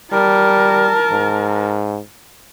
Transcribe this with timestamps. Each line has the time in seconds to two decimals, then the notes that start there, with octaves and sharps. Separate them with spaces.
0.12 G3 A#4 A5
1.11 G#2